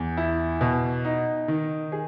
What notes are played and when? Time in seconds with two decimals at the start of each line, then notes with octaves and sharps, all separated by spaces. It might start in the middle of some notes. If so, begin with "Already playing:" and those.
Already playing: E2
0.17 E4
0.61 B2
1.05 D#4
1.48 D#3
1.92 G#4